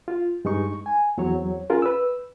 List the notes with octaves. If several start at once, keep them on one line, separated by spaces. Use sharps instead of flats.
F4
G2 G#3 D#4 C#6
G#5
E2 F#3 C4 C#5
C#4 F4 G#4 A#4
B4 E6